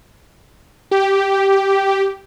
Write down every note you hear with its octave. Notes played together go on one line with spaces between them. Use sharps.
G4